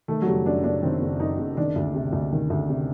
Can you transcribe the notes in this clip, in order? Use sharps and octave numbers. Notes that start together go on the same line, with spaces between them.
D#3 A3
F#3
F#1 G3
F#2 D4
F#1 D4
D#3 C4
F#1
F#2 D#4
F#1
D#3 D4
D2
C3
D2
D#3
D2
C3